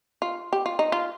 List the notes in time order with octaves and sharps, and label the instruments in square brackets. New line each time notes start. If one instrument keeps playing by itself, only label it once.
[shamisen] F4
G4
F4
D#4
F4